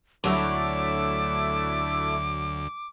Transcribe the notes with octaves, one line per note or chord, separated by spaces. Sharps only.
D2 F#3 A3 D4 E4 C#5 D6